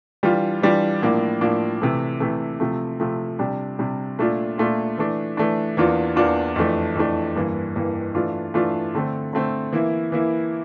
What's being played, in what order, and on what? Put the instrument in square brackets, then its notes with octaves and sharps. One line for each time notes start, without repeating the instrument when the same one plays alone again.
[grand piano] E3 G3 D4 F4
E3 G3 D4 F4
A2 F3 A#3 D4
A2 F3 A#3 D4
C3 E3 A3
C3 E3 A3
C3 F3 A3
C3 F3 A3
C3 G3 D4
C3 G3 D4
A#2 A3 D4 F4
A#2 A3 D4 F4
E3 A3 D4
E3 A3 D4
E2 E3 A#3 D4 F4
E2 E3 A#3 D4 F4
F2 E3 A3 D4
F2 E3 A3 D4
G2 E3 A#3
G2 E3 A#3
E3 A3 D4 F4
E3 A3 D4 F4
D3 A3 C4
D3 A3 C4
E3 A#3 E4
E3 A#3 E4